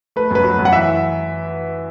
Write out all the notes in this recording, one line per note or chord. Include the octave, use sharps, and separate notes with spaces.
A3 B4
F#2 B4
F#3
F#2
F#5
E3 E5